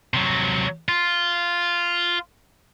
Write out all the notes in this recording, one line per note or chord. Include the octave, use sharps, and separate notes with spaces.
C3 F#3
F4